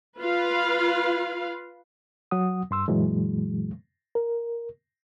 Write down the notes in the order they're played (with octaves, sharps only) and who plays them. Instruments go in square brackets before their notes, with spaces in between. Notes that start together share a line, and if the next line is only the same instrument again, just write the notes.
[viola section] F4 B4 F5
[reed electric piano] F#3 F#5 D#6
G2 C6 E6
F#2 A#2 E3 F#3 G#3
A#4